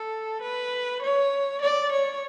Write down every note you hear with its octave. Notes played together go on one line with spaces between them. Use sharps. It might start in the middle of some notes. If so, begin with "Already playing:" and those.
Already playing: A4
B4
C#5
D5
C#5